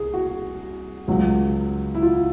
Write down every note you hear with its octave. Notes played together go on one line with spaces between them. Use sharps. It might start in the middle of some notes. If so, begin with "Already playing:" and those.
Already playing: C2 G#4
F#4
C#2 C#3 F#3
E4
F4